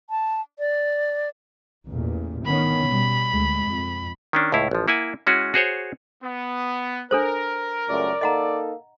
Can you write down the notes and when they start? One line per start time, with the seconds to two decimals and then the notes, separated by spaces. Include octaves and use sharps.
0.10 A5
0.59 D5
1.87 A1 E2 A#2
2.45 D#3 B3 C#4 B5
2.86 B2 G3
3.28 D2 G#3
3.67 F2
4.33 D#3 C#4 D4
4.52 C#2 A2 E4 F5
4.71 A1 F3
4.88 A#3 E4 F#5 G#5
5.27 G#3 C#4 E4 F#4 G#4
5.54 F#4 G#4 C5 C#5
6.23 B3
7.11 D4 A4 A#4 C5
7.89 C#2 F#2 A3 D5
8.21 A#3 D#4 A4 D#5 F#5 A#5